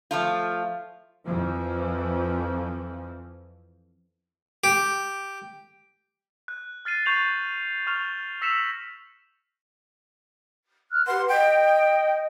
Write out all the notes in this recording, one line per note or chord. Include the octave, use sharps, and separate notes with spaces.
F3 A3 F4
F2 E3 F3
G4
F#6
F6 A6 C7 D#7
C#6 G6 A6 C7 F7 F#7
C#6 F6 F7
E6 A#6 B6 C#7 E7 F7
F6 F#6
G4 B4 F#5 C6
D#5 G5